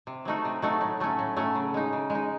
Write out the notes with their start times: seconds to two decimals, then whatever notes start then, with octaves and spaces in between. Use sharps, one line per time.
0.07 C3
0.25 F#3 A3 D#4 F#4
0.45 C3
0.62 F#3 A3 D#4 F#4
0.81 A2
1.00 F#3 A3 C#4
1.19 A2
1.36 F#3 A3 C#4
1.55 C#3
1.74 G#3 D#4
1.92 C#3
2.10 G#3
2.15 D#4